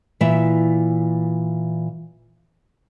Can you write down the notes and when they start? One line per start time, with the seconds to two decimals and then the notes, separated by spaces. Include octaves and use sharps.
0.21 A#2 E3 E5